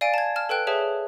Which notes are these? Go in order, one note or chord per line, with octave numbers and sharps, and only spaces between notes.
D5 F5 G#5 A6 D7
A5 G#6
A5 F6
A4 B4 G5 F#6
G#4 B4 C#5 E5 A5